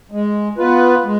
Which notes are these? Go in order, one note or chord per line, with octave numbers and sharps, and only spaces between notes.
G#3
B3 F4 B4
G#3